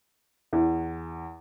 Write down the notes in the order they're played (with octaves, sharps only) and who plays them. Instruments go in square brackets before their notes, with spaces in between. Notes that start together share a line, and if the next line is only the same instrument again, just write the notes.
[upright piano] E2